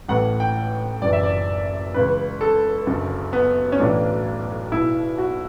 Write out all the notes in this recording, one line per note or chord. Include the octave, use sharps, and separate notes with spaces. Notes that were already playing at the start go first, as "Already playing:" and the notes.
A1 A2 E3 F#5
G5
F#1 F#2 E3 D5
E5
D5
C#2 C#3 E3 B4
A4
F#1 F#2 D3
B3
C#4
B1 A2 E3 D4
B1 B2 E4
F#4